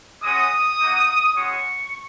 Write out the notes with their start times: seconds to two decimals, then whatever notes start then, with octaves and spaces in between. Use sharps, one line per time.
0.23 G#3 C#4 F#4 D#6
0.80 A#3 D#4 F#4
1.35 G#3 C#4 F#4 C#6